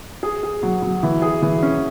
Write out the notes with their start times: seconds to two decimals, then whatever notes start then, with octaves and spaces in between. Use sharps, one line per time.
0.23 G#4
0.43 G#4
0.63 F#3
0.82 F#3
1.03 E3
1.22 G#4
1.42 E3
1.63 C#4